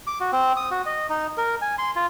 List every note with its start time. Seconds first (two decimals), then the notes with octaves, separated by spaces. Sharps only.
0.07 D6
0.20 F#4
0.32 C4
0.56 D#6
0.71 F#4
0.86 D#5
1.10 D#4
1.38 A#4
1.62 G#5
1.78 C6
1.96 F4